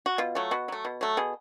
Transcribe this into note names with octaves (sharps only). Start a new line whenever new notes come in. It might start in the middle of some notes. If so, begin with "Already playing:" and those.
F#4
B2 F4
F#3 A3
B2 F#4
F#3 A3
B2
F#3 A3
B2 G#4